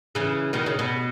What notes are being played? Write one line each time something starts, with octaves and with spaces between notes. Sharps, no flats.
C#3 E3
B2 D#3
C#3
B2